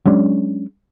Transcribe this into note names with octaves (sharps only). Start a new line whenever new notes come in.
F#3 G#3 C#4 D4